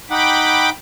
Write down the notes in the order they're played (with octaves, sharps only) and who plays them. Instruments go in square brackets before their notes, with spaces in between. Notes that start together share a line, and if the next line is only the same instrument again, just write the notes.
[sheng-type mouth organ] D#4 F#5 [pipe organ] G5 B5 D6